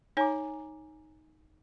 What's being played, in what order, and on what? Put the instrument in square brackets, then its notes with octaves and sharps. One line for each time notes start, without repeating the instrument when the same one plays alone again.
[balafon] D#4 C#5 [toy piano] G#5 A#5 D6